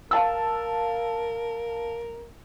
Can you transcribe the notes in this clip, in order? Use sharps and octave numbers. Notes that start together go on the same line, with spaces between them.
A#4 F5 A5 E6